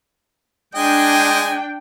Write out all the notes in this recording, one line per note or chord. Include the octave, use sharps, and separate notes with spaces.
G#3 D4 D#5 G5 G#5